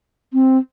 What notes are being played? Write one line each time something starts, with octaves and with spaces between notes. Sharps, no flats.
C4